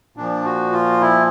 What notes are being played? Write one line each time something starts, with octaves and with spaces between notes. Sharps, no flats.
A#2 F3 D4
F#4
F4
E4